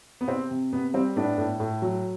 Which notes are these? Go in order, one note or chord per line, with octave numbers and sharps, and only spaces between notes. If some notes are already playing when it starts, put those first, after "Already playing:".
B3
C3 C4
C3
C3 B3
G3 C4
A2 B3 D4
A2
A2
F#3